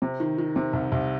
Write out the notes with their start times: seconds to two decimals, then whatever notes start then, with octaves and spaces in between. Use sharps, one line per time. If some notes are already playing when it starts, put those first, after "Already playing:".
0.02 C3
0.20 D#3
0.38 D#3
0.56 C3
0.73 C2
0.92 C2